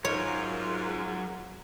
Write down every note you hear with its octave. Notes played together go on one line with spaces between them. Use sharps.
G#2 F#3 F4 A#4 C#5